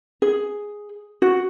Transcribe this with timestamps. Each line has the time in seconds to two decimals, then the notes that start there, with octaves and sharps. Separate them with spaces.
0.22 G#4
1.22 F#4